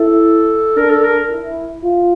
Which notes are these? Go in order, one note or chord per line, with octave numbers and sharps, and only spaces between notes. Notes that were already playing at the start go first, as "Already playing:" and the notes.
Already playing: E4 A4
D4 A#4
A4
A#4
E4
F4